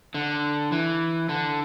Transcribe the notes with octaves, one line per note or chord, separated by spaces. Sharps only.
D3
E3
D3